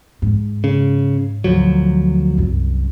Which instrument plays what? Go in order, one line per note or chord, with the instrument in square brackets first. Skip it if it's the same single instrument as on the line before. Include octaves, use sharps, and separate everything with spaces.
[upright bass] G#2
[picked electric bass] C#3
D2 F3 F#3
[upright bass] C2 F#2